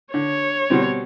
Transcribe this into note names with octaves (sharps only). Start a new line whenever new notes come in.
D3 C#5
B2 G3 C4